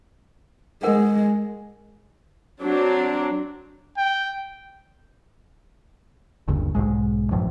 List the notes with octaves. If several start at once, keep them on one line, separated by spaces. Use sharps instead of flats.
G#3 A#4 F#5
F#3 C4 D4
G5
G1 D#2 C#3
B1 F2 G#2 G#3
A1 F#2 F3